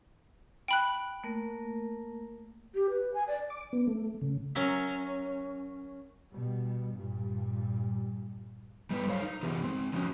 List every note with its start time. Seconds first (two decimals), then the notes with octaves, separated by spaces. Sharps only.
0.68 G5 B5 F#6
1.24 A3 A#3 A#4
2.75 G4
2.90 B4
3.14 G#5
3.28 D5
3.50 D6
3.73 B3
3.87 A3
4.22 C#3
4.55 F#3 C#4 A#4 E5
6.31 B2 G3
6.93 G2 A#2 G3
8.91 G3 B3 D#4 B4
9.07 F#3 A4 C5 C#5 F5
9.22 D#4
9.43 C3 E3 B3 F4 G4 G#4
9.64 G#3 C4
9.94 F3 C4 C#4 D#4 F#4